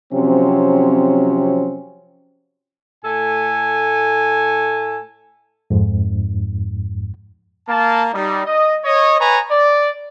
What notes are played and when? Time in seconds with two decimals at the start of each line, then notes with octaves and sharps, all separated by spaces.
0.13 C3 F3 F#3 C4 C#4
3.05 A2 A3 A4 G#5
5.70 F2 G#2
7.69 A#3 A5
8.13 G3 D#4
8.46 D#5
8.85 C#5 D#5
9.20 B4 C#5 G#5 A#5
9.51 D5